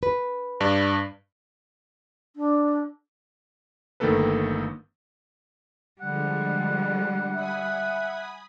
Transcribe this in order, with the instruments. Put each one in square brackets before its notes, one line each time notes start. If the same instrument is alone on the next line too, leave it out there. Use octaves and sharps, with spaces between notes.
[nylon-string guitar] B4
[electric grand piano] G2 D4
[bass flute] D4
[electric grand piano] G1 D#3 A3 A#3 A4 B4
[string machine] D3 F3 G#3 [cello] G3 [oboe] F#5
[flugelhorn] E5 [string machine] G#5 B5 D#6